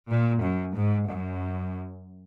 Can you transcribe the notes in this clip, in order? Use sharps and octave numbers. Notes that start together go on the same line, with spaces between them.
A#2
F#2
G#2
F#2